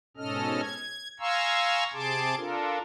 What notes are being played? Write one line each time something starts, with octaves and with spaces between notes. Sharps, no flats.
G#2 B2 C#4 A4 D#5 F6
G#6
F5 G#5 A#5 C6 C#6 E6
C3 G#4 A5 C6 D6
D4 F4 A4 A#4